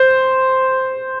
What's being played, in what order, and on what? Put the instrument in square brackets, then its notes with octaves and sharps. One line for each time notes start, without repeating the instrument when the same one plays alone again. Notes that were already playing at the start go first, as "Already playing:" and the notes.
Already playing: [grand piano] C5